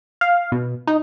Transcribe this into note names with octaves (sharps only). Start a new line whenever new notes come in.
F5
B2
D#4